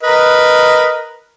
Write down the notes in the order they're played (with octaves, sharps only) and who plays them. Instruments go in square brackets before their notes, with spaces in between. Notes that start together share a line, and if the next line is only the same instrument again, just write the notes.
[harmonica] A#4 B4 D#5